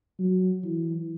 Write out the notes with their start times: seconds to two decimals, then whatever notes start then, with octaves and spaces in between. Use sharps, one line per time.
0.19 F#3
0.64 E3